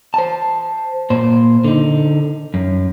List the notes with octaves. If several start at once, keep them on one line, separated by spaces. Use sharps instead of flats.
C5 A5
A#2 C5
D3 D#4
F#2